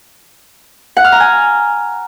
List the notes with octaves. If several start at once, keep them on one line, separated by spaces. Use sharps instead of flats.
F#5
F6
A#5
G#5